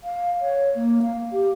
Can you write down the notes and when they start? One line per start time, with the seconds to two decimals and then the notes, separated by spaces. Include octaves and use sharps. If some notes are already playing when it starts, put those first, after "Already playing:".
0.04 F5
0.41 C#5
0.75 A#3
1.03 F5
1.32 G4